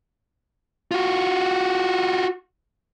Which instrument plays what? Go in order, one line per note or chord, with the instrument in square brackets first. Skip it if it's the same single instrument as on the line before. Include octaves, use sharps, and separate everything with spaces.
[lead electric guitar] F4 F#4